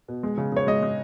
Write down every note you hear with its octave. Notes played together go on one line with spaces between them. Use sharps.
B2
G#3
C#3
C#3 C#5
G#3 D#5
G#3